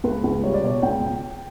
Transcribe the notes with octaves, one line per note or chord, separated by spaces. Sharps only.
C#2 B4
C#2
G3 C#5
D5
B2 C#5
C#2 G5